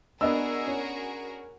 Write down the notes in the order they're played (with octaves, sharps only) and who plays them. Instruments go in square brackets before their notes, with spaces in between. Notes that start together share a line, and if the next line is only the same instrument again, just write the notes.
[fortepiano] B3 D4 [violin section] F#4 G#4 A#4 [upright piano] D#5 E6
[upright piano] C#4